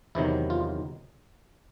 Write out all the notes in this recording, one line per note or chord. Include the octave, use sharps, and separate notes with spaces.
E2 C3 D#3 F#3 E4
F4